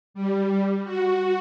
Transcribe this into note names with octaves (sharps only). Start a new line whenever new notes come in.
G3
F#4